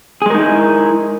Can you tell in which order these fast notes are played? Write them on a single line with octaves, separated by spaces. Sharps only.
G#4 G#3 A#4 D#4 E4